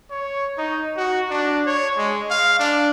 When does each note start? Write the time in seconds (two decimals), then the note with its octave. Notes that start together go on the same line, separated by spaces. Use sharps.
0.11 C#5
0.58 D#4
0.97 F#4
1.30 D4
1.66 C#5
1.97 G#3
2.30 F5
2.59 D4